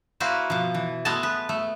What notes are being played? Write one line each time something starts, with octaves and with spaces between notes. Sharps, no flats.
A#3 E4 F#4 B4 C5
B2 F3
E3
G#3 A3 B3 D#5 G#5 A5
B4
A3